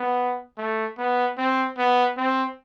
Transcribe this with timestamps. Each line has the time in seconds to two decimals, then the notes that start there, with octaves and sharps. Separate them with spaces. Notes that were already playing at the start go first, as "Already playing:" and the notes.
Already playing: B3
0.58 A3
0.98 B3
1.38 C4
1.77 B3
2.17 C4